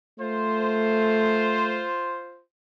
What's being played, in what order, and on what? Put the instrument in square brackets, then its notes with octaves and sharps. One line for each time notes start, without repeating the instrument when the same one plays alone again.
[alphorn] A3 [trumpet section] F4 C5